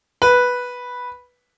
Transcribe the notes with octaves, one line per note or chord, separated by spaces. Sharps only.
B4